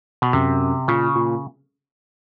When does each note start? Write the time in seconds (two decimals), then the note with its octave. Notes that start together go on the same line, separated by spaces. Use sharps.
0.22 B2
0.33 F#2 C3
0.88 A#2 C#3
1.16 A#2